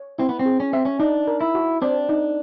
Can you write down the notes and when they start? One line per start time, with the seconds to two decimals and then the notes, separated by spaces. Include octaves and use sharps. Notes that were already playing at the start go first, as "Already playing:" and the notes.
Already playing: C#5
0.19 C4 E4
0.29 B3
0.39 C4
0.46 G#4
0.60 C#4
0.73 C4 E5
0.85 C#4
1.00 D4 D#4
1.28 A#4
1.41 E4
1.55 F#4
1.82 C4 D4
2.09 D#4